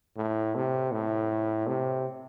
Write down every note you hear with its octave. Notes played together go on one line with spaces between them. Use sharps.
A2
C3
A2
C3